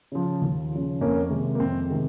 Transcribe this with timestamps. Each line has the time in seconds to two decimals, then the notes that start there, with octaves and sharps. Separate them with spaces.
0.12 C#3 F3
0.42 D#2
0.71 C#3 F3
1.01 F2 A#3 C#4
1.30 C3 D#3 G#3
1.55 A#3
1.60 F2 C4
1.90 C3 D#3 G#3